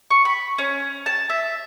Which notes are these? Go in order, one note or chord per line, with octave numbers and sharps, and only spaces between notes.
C#6
B5
C#4
A5
E5